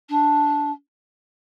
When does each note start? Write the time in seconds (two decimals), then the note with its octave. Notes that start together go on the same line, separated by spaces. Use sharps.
0.09 D4